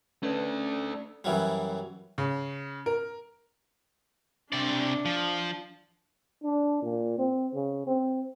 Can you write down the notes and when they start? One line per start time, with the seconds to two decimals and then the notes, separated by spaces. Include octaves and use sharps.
0.23 A3 C#4 D4 B4
1.24 F#2 E3 F#3 G3
2.18 C#3
2.86 A#4
4.53 C3 D4 D5
5.05 F3
6.44 D4
6.82 A#2
7.18 C4
7.54 C#3
7.87 C4